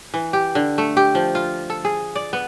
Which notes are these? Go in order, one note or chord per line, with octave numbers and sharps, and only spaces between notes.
E3
G4
D3
A3
G4
F3
F4
A4
G#4
D5
B3